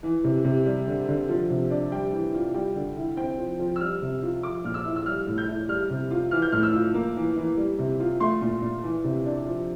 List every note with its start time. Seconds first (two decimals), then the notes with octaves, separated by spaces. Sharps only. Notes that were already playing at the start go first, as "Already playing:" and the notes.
0.03 E3
0.24 C3
0.45 C3
0.66 G3
0.87 D3
1.08 D3
1.29 F3
1.50 C3
1.71 D4
1.92 G3 G5
2.12 E3
2.34 F4
2.54 G3 G5
2.75 D3
2.97 E4
3.17 C4 G5
3.38 F3
3.59 F3
3.76 E6
3.81 G3 F6
4.02 C3
4.22 F4
4.43 F3 D6
4.64 A#2 F6
4.74 E6
4.85 E4
4.96 E6
5.06 G3 F6
5.27 A2
5.38 G6
5.48 E4
5.69 G3 F6
5.90 C3
6.11 F4
6.31 E3 F6
6.42 G6
6.52 A2 F6
6.63 E6
6.73 F4
6.94 A#3
7.16 E3
7.36 E3
7.57 G3
7.78 C3
8.00 F4
8.20 A3 C6
8.41 A#2
8.62 A#2
8.83 E3
9.04 C3
9.25 D4
9.46 F3